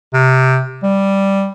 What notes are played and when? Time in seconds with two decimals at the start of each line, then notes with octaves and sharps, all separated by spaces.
0.13 C3
0.83 G3